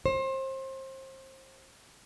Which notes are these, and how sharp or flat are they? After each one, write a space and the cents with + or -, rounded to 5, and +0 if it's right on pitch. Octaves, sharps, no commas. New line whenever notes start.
C5 +30